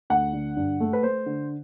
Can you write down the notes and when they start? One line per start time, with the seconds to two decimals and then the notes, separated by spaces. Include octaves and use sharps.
0.10 D2 F#5
0.33 D3
0.57 G2
0.80 A3
0.93 B4
1.03 A3 C5
1.26 D3